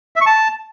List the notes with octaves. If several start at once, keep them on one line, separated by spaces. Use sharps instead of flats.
E5
C#6
A5